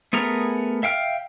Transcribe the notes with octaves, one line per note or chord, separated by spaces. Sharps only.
A3 B3 G#4 A#4 A#5
E5 F5 G5 F6